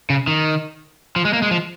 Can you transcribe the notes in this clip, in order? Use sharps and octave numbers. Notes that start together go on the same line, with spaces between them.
C#3
D#3
F3
G#3
A#3
G#3
F3